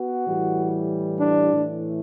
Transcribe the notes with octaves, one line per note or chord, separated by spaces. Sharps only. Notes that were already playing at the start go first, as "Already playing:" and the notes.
Already playing: B3 F#4
A2 E3 G3
D4
A2 E3 A3